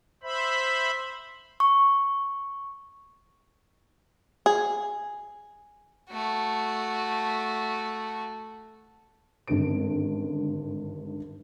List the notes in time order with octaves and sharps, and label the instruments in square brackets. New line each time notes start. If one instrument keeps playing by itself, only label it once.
[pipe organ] C5 E5 B5
[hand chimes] C#6
[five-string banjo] G#4
[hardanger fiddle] A3 F#4
[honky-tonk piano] G#1 G2 D3 C#4 D7